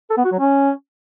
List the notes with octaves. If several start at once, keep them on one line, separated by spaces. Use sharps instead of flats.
A4
B3
F#4
F#3
C#4